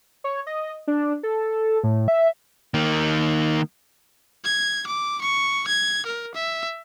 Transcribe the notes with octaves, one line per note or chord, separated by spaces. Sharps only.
C#5
D#5
D4
A4
A2
E5
D#3 A#3
G#6
D6
C#6
G#6
A#4
E5